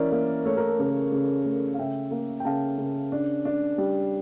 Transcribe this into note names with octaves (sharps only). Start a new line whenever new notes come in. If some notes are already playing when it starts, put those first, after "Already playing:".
Already playing: E3 C#4 A#4 D5 E5
A#3
A3 C#5
A#4
A4
C#3 A#4
C#3
A3
F5
C#3 E5 G5
A#3
G5
C#3 F5 A5
C#3
D4
D4
G3